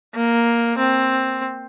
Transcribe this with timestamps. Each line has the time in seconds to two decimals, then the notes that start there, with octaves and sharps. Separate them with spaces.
0.15 A#3
0.78 C4